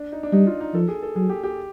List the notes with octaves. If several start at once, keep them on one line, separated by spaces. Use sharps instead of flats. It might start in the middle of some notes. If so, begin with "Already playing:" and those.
Already playing: D4
D#4
D4
G3 D#4
F4
D#4
F3 A4
G#4
A4
F#3 G#4
G4
G4